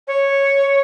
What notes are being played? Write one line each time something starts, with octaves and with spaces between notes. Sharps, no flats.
C#5